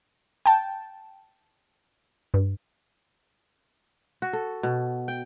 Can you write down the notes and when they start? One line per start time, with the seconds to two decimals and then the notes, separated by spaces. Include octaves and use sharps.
0.46 G5 A5
2.34 G2
4.22 F#4
4.33 A4
4.63 B2
5.08 G5